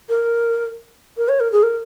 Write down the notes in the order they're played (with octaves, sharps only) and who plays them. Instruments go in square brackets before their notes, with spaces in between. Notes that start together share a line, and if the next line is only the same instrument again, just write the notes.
[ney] A#4
A#4
C#5
A#4
G#4
A#4